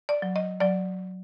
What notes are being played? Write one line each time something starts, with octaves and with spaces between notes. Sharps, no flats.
D5
F#3
D#5
F#3 D5